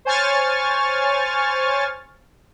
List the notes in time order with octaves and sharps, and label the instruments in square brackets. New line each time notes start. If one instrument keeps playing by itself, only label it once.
[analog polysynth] C5 C#5 G#5 C#6 F6 A6